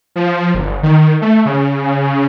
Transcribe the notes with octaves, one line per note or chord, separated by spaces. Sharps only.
F3
G1
D#3
A3
C#3